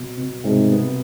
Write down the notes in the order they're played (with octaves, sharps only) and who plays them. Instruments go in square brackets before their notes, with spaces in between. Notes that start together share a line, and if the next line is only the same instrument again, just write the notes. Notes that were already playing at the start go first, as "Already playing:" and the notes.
Already playing: [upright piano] B2
B2
[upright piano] C2 [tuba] G#2
[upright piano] B3